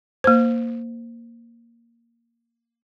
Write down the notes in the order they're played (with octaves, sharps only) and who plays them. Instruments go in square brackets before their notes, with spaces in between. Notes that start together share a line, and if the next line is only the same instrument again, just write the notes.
[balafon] A#3 C5